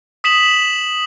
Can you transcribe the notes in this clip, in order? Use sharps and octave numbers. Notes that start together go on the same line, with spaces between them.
D#6 B6 E7 F#7